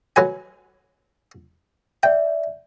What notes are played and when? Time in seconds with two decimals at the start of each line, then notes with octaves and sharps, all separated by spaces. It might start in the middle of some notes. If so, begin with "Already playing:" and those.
0.16 F#3 B4 G#5
2.03 D5 E5 G5